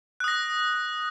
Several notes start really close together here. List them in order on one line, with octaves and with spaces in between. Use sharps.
F#6 D#6 A#6